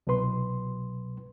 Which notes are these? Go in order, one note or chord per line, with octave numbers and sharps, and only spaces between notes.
C2 B2 F#3 B4 C6